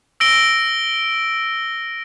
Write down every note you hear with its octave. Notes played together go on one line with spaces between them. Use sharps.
E6 A#6 D7 G7